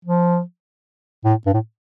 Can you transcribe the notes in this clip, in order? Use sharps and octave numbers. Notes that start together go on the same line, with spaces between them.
F3
A2
G2
A2